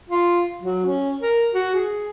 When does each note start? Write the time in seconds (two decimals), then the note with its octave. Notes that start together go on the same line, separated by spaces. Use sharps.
0.10 F4
0.62 F#3
0.86 C#4
1.21 A#4
1.54 F#4
1.75 G#4